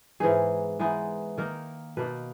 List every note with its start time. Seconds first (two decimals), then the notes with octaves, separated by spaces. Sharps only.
0.20 G#2 E3 B3 D#4 G#4
0.79 E3 G#3 B3 D#4
1.37 D#3 A#3 D#4 A#4
1.97 B2 A#3 D#4 B4